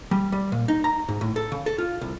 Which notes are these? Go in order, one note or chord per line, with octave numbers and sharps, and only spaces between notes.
G3
G3
A#2
D#4
A#5
G#2
A2
A4
C#3
A4
F4
C2